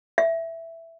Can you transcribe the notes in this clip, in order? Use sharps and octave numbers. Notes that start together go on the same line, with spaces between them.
E5